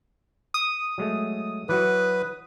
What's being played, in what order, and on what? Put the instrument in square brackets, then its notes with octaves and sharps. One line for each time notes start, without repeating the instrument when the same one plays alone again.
[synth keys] D#6
[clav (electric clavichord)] F#3 G#3 A3
[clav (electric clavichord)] E3 F#3 F#4 [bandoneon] B4